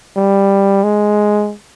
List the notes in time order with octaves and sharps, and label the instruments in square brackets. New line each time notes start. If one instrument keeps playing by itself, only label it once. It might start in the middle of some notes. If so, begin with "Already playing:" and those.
[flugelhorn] G3
G#3